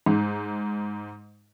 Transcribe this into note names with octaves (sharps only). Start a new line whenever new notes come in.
G#2